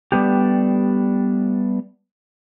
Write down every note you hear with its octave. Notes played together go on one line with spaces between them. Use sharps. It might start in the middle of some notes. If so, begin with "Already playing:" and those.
G3 A3 B3 D4 G4